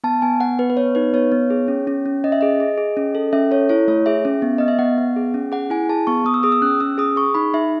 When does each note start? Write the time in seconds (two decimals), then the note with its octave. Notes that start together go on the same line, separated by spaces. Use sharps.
0.04 B3 A5
0.22 B3 G#5
0.40 B3 F#5
0.59 B3 B4
0.70 B4
0.77 B3 C#5
0.95 D#4 B4
1.14 B3 C#5
1.32 B3
1.50 G#4
1.68 C#4
1.87 C#4
2.06 C#4
2.24 C#4 D#5
2.32 E5
2.41 G#4 D#5
2.60 G#4
2.78 G#4
2.97 C#4
3.15 A4
3.33 C#4 E5
3.51 A4 C#5
3.69 E4 C#5
3.88 A3 C#5
4.06 G#4 E5
4.25 C#4
4.42 B3
4.58 B3 D#5
4.68 E5
4.79 B3 F#5
4.98 B3
5.16 G#4
5.34 C#4
5.52 G#4 F#5
5.70 E4 G#5
5.89 G#4 A5
6.07 B3 C#6
6.25 B3 D#6
6.34 E6
6.43 G#4 D#6
6.52 E6
6.62 C#4 F#6
6.80 C#4 E6
6.98 G#4 D#6
7.16 G#4 C#6
7.34 D#4 B5
7.53 D#4 E5